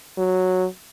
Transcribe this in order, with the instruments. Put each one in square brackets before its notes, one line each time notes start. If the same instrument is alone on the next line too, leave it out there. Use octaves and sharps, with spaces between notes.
[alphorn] F#3